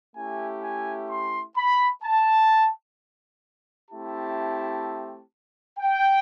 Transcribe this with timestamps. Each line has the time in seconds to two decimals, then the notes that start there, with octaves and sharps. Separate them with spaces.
0.15 A3 C#4 E4 G4 G#5
0.63 G#5
1.09 C6
1.56 B5
2.04 A5
3.91 A3 C4 E4 G4 A5
5.79 G5